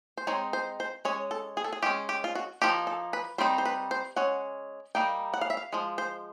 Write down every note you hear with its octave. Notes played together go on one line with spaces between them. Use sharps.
C5
G#3 C4 D#4 C#5
C5
C5
G#3 C#4 C#5
A4
G#4
A4
G#4
G#3 C#4 G4
G4
F4
F#4
F3 A#3 D#4 G4
A4
B4
G3 C4 D#4 C5
C5
B4
C5
G#3 C#4 F#5
G3 A#3 D#4 G5
F#5
F5
E5
F5
F3 G#3
C5